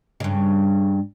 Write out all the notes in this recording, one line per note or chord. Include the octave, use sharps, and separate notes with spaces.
G2 C#3